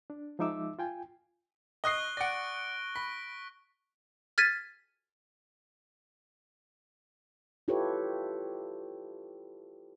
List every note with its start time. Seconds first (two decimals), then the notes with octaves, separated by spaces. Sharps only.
0.10 D4
0.39 F3 G#3 D#4 E5 D6 E6
0.79 F4 G5 G#5
1.84 D#5 C#6 D#6 F#6 C7 G7
2.17 D5 F#5 A#6 D7
2.96 B5 B6
4.38 F6 G#6 A6 B6 D#7
7.68 E4 F4 G4 A4 B4 C#5